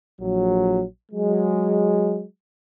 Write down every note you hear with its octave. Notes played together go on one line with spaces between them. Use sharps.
A#1 F#3
F#3 G#3